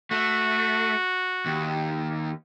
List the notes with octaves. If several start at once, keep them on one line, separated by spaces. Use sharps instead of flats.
A3 F#4
D#2